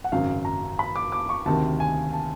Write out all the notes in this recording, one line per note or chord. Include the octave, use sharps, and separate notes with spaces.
F#5
G#1 F#2 C#3 F#3 F5
A#5
B5
D6
D6
C#6
D2 C3 D#3 A5
G#5
A5